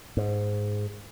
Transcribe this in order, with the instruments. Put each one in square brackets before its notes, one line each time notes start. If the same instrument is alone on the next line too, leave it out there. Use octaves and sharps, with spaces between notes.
[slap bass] G#2